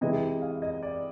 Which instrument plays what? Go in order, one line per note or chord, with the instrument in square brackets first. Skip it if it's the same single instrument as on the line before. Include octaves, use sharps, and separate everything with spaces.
[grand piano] C3 E3 G#3 D#5
F5
D#5
D5